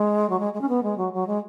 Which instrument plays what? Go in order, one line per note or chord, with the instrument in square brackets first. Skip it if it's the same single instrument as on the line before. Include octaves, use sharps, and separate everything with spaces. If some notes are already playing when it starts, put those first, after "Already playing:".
Already playing: [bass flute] G#3
F#3
G#3
G#3
C#4
B3
G#3
F#3
F#3
G#3